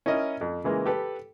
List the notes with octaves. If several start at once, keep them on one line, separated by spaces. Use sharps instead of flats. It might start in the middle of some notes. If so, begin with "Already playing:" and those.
C#4 E4 A#4 D#5
F2
C#3 E3 G#3 A#3
G4 A4 B4